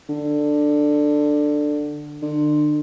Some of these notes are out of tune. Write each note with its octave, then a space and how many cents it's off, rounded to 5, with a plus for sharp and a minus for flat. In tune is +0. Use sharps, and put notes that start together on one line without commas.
D3 +10
D3 +35